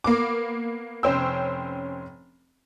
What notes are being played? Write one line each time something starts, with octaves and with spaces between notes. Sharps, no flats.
A#3 B3 D6
F1 C#4 C5 G5 E6